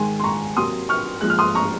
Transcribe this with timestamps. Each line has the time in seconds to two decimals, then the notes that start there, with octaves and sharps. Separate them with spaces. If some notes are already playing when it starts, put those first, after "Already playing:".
Already playing: G#2 D#3 G#3 G#5 C6
0.19 C6
0.24 A#5 C#6
0.57 C3 F#3 A#3 C6 D#6
0.89 C#6 F6
1.21 A#2 F3 G#3 F#6
1.30 F6
1.39 C6 D#6
1.55 A#5 C#6